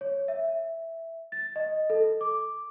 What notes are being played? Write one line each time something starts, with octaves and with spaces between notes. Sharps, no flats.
C#5
E5
A6
D#5
A4
D6